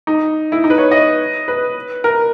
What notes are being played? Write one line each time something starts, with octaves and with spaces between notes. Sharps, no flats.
D#4
E4
D#4
B4
C#5
D#5
B4
A#4